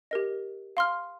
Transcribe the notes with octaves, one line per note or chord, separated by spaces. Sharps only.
G4 A#4 D#5
F5 C6 F6